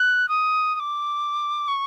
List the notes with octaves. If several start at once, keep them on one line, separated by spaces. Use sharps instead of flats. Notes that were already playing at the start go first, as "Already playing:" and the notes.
Already playing: F#6
D#6
D#6
D6
C#6